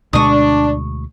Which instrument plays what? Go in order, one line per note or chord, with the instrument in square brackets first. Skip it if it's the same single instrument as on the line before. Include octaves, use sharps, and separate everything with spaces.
[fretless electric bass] D2 B2 G#3 [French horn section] D4 [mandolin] C#6 D#6